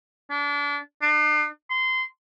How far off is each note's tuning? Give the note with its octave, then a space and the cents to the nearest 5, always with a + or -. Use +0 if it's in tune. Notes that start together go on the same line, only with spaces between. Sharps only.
D4 -30
D4 +45
C6 -20